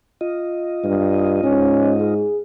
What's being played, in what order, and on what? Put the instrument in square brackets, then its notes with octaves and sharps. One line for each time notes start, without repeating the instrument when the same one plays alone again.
[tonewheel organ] F4 D#5
[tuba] G2
[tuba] G#2 [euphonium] C#4
[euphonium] G#4